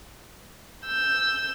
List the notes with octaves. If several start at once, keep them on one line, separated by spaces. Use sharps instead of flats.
E6 G6